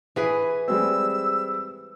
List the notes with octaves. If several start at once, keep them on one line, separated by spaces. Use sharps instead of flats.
E3 G#4 B4
G3 G#3 C4 E6